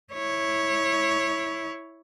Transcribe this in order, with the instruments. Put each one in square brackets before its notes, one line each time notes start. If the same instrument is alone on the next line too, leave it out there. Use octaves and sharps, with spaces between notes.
[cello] E4 C#5